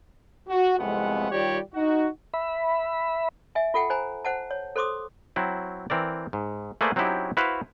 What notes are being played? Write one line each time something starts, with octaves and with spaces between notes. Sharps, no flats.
F#4
C2 F2 G#3 A3 B3 F#5
D#3 G3 F4 G4 C#5 D5
D#4 F#4
E5 B5
E5 G#5
F4 A4 F#5 G5
C5 G#5 A#5
C5 F#5 A5
C#5
A4 C5 C6 D6 D#6
F#3 C4 E4
E3 C4 A#4 D5
G#2
A3 A#3 G#4 B4 C5 D5
F#3 C4 C#4 D#4 E4 G4
E4 F#4 B4 C5 F5